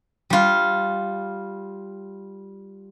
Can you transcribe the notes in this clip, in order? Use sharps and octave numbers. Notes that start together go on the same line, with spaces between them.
G3 F4